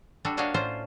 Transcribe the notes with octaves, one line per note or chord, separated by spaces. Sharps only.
G3 D4 F#4 A4
A#3 D4 F#4 C#5 D#5 F5
A2 C#4 D4 F4 C5 A#5